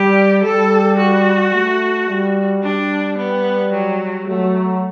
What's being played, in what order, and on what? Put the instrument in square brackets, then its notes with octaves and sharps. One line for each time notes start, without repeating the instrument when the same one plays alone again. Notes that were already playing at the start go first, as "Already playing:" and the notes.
Already playing: [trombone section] G3 [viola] G4
[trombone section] G3 [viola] A4
[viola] F#4
[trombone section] A3
G3
[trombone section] G3 [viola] D4
[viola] B3
F#3
[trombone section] F#3 [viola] A3